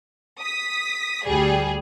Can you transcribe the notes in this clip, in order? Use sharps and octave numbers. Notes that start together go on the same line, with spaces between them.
D#6 B6
D2 G3 G#4